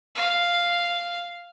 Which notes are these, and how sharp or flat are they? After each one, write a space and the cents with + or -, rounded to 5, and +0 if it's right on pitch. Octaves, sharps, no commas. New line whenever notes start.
F5 -5